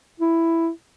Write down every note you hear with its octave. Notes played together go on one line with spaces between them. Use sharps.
E4